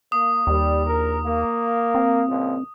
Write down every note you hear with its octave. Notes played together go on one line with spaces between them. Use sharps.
A#3 D#6
D#2 G3
A#1 A#4
A#3
C4
C#2 A#2 F3